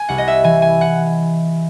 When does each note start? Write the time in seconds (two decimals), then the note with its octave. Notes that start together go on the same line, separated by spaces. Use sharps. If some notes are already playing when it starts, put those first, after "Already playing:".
Already playing: G#5
0.09 C2 F#5
0.18 D#5
0.28 E5
0.44 E3 G#5
0.62 G#5
0.81 F#5